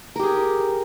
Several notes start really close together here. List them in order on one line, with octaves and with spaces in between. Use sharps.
A#4 G4 G#4